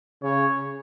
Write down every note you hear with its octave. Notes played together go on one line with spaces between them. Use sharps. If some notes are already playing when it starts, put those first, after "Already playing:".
C#3 C#5